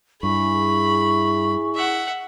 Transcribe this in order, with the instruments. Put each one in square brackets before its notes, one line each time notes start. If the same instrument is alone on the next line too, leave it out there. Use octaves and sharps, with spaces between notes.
[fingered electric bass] G2 [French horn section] E4 G#4 [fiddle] B5 [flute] C#6
[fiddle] E5 F#5